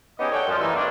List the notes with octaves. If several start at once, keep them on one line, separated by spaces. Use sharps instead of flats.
B3 C#4 D#4 G4 G#4 D#5
A4 C#5 D5 F#5 G5
F#2 F3
E3 G3 A3 A#3 D#4 E6
G2 B2 G3 C#4 D4 C6